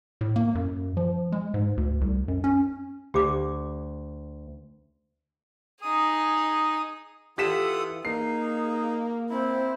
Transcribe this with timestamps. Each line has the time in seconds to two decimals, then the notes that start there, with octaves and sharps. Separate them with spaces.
0.21 A2
0.36 A#3
0.55 F#2
0.97 F3
1.32 G#3
1.54 G#2
1.77 D2
2.01 C2
2.28 F#2
2.44 C#4
3.14 D2 G4 D6
5.81 D#4 G#4 D#6
7.38 E3 F4 G4 A4 F#5 D#6 B6 E7
8.05 A#3 D#4 G#4 C7
9.30 C4 E4